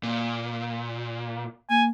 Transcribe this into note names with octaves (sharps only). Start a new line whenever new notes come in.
A#2
A#3 G#5